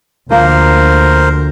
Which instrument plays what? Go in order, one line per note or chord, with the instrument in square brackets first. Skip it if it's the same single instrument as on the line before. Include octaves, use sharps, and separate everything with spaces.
[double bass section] D2 [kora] F3 A#3 [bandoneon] A#4 C5